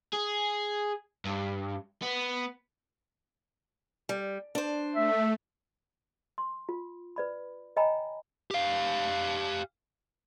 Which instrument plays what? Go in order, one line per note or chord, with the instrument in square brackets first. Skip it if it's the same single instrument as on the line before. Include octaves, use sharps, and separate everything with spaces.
[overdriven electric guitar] G#4
G2
B3
[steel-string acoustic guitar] G3
D4 C5
[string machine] A3 [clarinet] E5
[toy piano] C6
F4
B4 D5 B5
C#5 D#5 G5 G#5 A#5 B5
[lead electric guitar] G4 F5